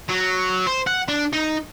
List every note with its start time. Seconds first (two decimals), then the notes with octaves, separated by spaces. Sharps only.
0.09 F#3
0.67 C5
0.87 F#5
1.08 D4
1.33 D#4